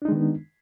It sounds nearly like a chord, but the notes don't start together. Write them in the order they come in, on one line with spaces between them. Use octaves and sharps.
D4 D#4 G#3 D#3 B3